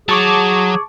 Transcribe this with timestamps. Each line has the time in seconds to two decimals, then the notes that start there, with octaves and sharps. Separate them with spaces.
0.09 F#3 G#4 A5 C#6 D6